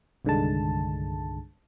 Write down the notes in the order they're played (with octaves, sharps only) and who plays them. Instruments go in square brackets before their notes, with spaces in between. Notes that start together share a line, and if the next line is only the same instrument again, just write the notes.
[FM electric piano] C2 G2 D3 D#3 G#3 A5